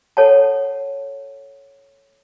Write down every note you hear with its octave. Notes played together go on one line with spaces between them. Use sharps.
A4 C#5 F#5 A5